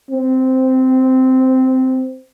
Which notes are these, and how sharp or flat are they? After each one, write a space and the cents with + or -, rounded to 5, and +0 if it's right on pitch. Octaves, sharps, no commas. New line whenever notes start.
C4 -10